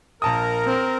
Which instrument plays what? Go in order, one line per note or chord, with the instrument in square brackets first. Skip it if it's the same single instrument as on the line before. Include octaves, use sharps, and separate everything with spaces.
[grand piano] A#1 A5 D#6 [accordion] A#4
[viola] C4